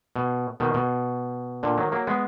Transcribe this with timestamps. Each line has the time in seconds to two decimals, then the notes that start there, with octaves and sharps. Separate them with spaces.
0.16 B2
0.60 B2 D#3
0.74 B2
1.63 A#2 D3
1.77 D#3 F#3
1.92 F#3 A#3
2.07 G#3 B3